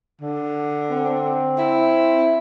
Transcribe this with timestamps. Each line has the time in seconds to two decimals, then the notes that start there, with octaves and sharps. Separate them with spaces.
0.22 D3
0.91 C4
1.58 E4